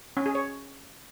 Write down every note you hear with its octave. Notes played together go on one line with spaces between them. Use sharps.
C#4
G#4
C#5